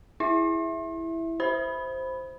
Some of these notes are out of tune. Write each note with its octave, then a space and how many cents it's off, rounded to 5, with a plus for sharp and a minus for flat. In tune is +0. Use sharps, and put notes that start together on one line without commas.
E4 +0 E5 +0
G4 -25 C5 +0 B5 +0